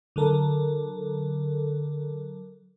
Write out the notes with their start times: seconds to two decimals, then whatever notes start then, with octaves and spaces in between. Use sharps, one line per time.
0.16 D3 F#3 A4 A#4